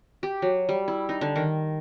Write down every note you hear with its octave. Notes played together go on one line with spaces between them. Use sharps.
G4
F#3
G3
E4
D#4
D3
D#3